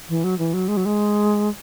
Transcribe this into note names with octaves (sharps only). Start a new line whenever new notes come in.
E3
F#3
E3
F#3
G#3
F#3
G#3